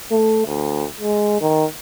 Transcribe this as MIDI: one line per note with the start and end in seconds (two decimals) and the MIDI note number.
0.11 0.43 57
0.47 0.85 38
1.00 1.38 56
1.41 1.65 51